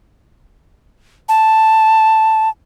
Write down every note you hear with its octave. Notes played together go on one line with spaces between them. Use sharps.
A5